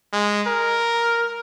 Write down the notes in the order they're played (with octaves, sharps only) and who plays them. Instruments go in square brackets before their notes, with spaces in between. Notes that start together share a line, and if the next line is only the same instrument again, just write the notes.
[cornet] G#3
A#4